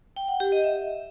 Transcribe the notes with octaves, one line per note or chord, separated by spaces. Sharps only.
G5
F#5
G4
D#5
E5